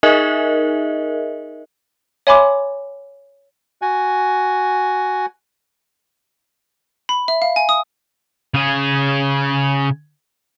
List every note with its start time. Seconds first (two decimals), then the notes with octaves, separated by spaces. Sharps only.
0.03 D#4 G#4 A#4 D#5 E5
2.27 C#5 E5 G#5 B5 C6 D6
3.82 F#4 G#5
7.09 B5
7.28 E5
7.42 F5
7.56 G#5
7.69 D#6
8.54 C#3 G#4